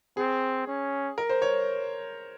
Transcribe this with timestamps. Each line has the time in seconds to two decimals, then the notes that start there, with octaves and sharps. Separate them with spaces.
0.17 C4 G#4
0.67 C#4
1.18 A#4
1.29 C5
1.42 C#5